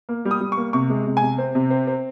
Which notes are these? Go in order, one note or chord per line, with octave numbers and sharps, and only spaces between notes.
A#3
G3
D#6
G3
C#6
A#3
C3 C#6
G#3
C3
G#5
C3
C4
C3
C4
C4